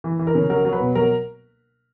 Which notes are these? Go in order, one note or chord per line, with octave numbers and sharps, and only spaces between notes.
E3
E3
A#4
C#3
F#3 A#4
F#3
B4
B2
F#3 A#4